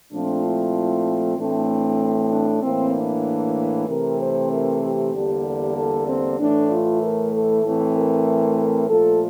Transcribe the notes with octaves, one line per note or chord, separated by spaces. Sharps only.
A#2 F3 A3 C4 D4
E4
A2 E3 A3 C4 D4
D4
A2 E3 A#3 C4
D4
C3 E3 A3 C4 A#4
C5
A#4
G4
E2 D3 G3 A#3
A4
C4
A2 E3 A3 D4
F4
A#4
A4
A2 E3 A3 C4
A#4
A#4
A#2 F3 A3 A4